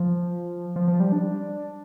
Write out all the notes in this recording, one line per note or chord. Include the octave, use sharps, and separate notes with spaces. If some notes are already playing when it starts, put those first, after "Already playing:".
Already playing: F3
F3
F3
G3
D4